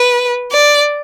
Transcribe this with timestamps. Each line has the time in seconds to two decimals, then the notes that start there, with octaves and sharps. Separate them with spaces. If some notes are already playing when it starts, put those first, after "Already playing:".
Already playing: B4
0.52 D5